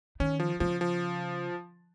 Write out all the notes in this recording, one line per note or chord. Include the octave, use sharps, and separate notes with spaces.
D#3 C#4
F3
C#3 F3
F3